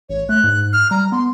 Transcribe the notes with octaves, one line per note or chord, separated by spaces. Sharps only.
A1 C#5
A3 F#6
G#2
F6
G3 A#5
B3 C6